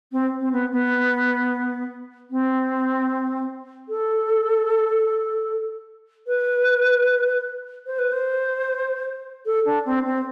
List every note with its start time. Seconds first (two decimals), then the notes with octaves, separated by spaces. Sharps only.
0.12 C4
0.40 C4
0.51 B3
0.71 B3
2.30 C4
3.88 A4
6.27 B4
7.86 C5
7.98 B4
8.12 C5
9.45 A4
9.65 D4
9.85 C4
10.05 C4